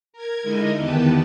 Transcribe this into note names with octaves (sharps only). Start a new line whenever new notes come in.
A#4 G#6
D3 G#3 D#4 E4 A#4 D#5
E2 D#3 B3 G4 B4 A5